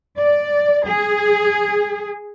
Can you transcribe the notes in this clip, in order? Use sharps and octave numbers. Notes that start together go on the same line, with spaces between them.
D5
G#4